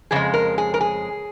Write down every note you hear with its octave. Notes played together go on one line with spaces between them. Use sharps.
F2 C#3 G#3 G#4
A#4
G#4
A#4
G#4